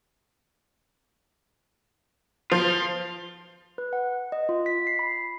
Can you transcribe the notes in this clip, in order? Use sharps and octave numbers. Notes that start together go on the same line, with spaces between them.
F3 F4
B4
F#5
D#5
F4
B6
C7
B5